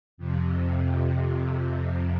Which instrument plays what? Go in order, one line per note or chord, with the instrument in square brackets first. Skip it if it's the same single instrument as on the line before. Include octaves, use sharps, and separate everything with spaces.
[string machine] F2 C3